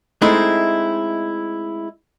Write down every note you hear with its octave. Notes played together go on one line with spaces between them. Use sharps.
G#3 A3 C4 D#4 E4